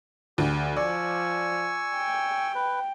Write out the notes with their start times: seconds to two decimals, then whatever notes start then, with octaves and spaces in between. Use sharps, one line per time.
0.38 D2 G4
0.76 F3 D5 G#5 C#6 E6
1.95 G5
2.55 B4